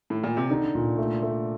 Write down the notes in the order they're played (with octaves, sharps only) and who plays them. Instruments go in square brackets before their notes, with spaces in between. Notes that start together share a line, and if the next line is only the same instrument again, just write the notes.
[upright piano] A2
A#2
C3
[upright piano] D3 [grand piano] D#4
[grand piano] A#2
A3
A3